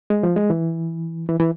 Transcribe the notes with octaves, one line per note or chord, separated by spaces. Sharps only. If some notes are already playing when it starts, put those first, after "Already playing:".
G#3
F3
G#3
E3
E3
E3